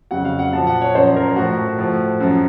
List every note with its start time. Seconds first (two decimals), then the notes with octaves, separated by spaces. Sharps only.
0.11 F2 C#3 F#3 F#5
0.25 F5
0.39 F#5
0.52 A#2 F3 A5
0.67 F#5
0.81 C#5
0.94 F#2 F3 C5
1.16 A#4
1.36 A2 F3 F#4
1.78 A2 F3
2.20 F#2 F3